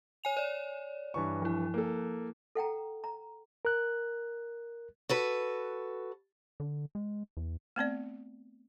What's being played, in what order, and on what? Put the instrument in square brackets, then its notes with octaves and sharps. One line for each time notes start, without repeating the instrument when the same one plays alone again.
[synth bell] C#5 G#5 F7
C#5 D5
[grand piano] G2 E3 C#6
[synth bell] F3 E4
[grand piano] A#3 A4
[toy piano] A4 F#5 G5 A#5
A#5
[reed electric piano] A#4 F#6
[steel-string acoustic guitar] F#4 A4 B4
[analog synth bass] D3
G#3
E2
[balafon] A3 B3 C4 D5